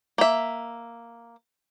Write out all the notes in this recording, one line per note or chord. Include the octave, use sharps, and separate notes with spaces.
A#3 E5